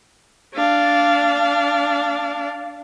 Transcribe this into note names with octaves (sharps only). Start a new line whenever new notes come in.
D4 F5